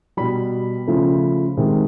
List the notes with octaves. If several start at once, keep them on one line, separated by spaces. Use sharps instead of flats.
B2 G3 B5
C#3 F3 A3
C3 D#3 G#3